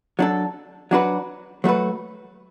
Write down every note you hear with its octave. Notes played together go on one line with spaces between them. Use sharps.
F#3 D4 A4
F#3 D4 F#4 B4
F#3 A3 F#4 B4